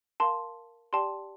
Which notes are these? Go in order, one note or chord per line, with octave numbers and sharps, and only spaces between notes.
A#4 F5 A5 C6
G4 D5 G5 A5 C6